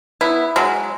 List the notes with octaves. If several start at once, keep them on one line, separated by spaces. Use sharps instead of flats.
B3 E4
F#3 G#3